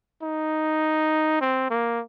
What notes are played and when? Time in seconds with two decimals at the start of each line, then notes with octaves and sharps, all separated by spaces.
0.23 D#4
1.41 C4
1.71 A#3